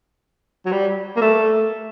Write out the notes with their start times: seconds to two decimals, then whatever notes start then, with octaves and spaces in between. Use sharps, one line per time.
0.66 F#3
0.72 G3
1.16 A#3
1.21 A3